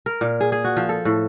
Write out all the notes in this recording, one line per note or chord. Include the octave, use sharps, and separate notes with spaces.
A#4
A#2
G#4
G#4
F#4
F3
A4
A2